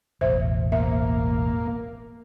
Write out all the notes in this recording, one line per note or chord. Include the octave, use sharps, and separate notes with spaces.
E1 A1 C5 E5
A#3 E5